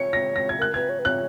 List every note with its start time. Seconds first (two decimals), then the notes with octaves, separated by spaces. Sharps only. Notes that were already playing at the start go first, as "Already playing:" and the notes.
Already playing: C#5 C#7
0.13 A#6
0.36 A#6
0.49 G#6
0.59 A#4 F#6
0.74 B4 G#6
0.89 C#5
0.99 B4
1.05 C#5 F#6